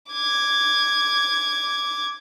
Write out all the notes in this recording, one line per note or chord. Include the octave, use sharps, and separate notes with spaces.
D6 G#6